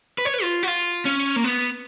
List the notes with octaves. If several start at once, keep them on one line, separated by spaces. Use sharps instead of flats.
B4
C#5
B4
F4
F#4
F4
C#4
A#3
B3